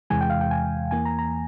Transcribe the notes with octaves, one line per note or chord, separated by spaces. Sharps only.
E2 C3 E3 G#3 G#5
G5
F5
G5
G#5
E2 E3 A#3 G#5
A#5
A#5